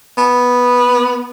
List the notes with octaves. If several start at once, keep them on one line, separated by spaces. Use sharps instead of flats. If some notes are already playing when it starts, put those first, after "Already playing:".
B3